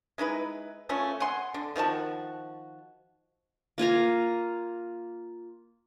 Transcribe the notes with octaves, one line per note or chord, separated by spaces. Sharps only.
G#3 D#4 E4 B4
A3 C#4 F4
F#5 G#5 C6
D3
D#3 F3 F#4 A5
A#3 F4 G#5 A#5